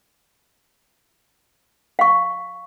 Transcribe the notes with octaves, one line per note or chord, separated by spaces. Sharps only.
F5 C#6